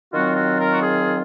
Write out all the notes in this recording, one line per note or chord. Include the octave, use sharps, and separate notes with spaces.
D#3 F#3 C4 F4 F#4
F#4
A#4
F#4
G#4